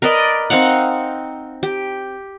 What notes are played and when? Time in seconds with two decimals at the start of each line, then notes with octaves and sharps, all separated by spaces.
0.02 A#4 B4 D5 D#5
0.50 C4 D#4 F5 F#5
1.63 G4